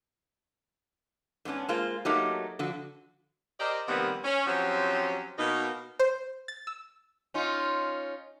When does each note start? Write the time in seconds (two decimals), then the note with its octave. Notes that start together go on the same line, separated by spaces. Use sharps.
1.45 G#2 B3 C#4 D4
1.69 G#3 A#3 F4 C5
2.05 F#3 A3 A#3 D#4 G4 A#4
2.59 D3 F3 F#4
3.59 G4 A#4 C5 D5 D#5
3.88 C3 D#3 F3 G3 A#3 B3
4.24 C#4
4.46 F3 F#3 C4 C#4 F#4 G4
5.38 B2 A#3 D#4
5.99 C5
6.48 A6
6.67 E6
7.34 C#4 D#4 F4